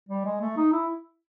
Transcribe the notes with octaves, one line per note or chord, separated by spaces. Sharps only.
G3
G#3
A3
D#4
E4